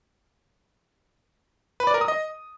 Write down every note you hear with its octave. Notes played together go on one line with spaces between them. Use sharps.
B4
D5
A#4
D#6
D#5